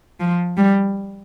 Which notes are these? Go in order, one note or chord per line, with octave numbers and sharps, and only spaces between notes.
F3
G3